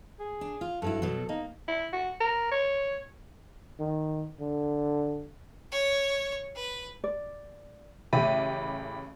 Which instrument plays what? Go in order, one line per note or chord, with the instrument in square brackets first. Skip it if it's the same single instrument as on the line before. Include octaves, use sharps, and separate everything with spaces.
[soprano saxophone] G#4
[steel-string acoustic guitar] D4
F4
[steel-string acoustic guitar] G2 F#3 E4 [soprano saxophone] A4
[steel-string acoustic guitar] B2 F#3
[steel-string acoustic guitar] A#3 [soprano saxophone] D#4
[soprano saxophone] E4
F#4
A#4
C#5
[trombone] D#3
D3
[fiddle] C#5
B4
[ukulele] D5
[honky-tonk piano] A1 G4 D#7 [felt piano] C#3 A3 [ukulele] E5 [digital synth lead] B5